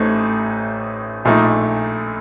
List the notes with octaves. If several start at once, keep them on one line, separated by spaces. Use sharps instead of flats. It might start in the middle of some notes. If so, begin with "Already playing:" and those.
Already playing: A1 A2 A3 C4 D#4
A#1 A#2 A3 D#4